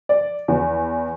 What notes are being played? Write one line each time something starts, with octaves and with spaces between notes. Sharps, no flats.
D5
E2